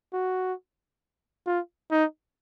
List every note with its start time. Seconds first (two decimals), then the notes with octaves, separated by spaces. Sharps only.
0.13 F#4
1.46 F4
1.91 D#4